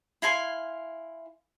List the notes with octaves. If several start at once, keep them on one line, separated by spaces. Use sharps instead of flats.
E4 F5 G#5 C6